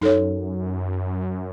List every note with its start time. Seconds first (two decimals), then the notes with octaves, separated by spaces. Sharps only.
0.01 F#2 D#4 A4 C#5